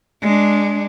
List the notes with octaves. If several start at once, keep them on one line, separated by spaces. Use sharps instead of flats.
G#3 D4